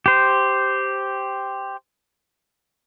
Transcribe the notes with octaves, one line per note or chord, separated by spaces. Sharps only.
G4 C5